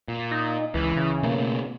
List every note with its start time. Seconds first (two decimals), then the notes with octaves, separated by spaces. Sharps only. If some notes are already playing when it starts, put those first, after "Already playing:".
0.08 A#2
0.31 D#4
0.74 C#2 E3
0.96 C#3
1.23 B2 A3 A#3